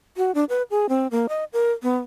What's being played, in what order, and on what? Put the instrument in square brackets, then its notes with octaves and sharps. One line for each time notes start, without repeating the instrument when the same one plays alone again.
[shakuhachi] F#4
D4
B4
G#4
C4
A#3
D#5
A#4
B3